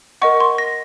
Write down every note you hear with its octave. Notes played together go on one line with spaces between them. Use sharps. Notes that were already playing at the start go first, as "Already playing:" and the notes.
A#4 D#5 F#5 C#6
C6
A#6